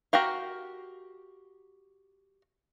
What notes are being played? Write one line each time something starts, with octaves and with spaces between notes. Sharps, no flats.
F#4 G4 A#4 F5